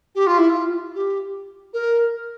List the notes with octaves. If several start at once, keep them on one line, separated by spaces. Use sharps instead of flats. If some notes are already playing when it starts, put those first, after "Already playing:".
G4
F4
E4
F4
G4
A#4